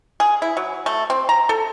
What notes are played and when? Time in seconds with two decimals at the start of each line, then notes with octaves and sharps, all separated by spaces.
0.20 G#4
0.42 E4
0.57 F#3
0.86 A3
1.10 C4
1.29 A#5
1.49 A4